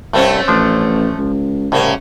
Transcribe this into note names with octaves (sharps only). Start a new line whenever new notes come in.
C2 G2 A3 C4 C#4
A1 F3 D4
C#2
C2 A2 C#3 A#3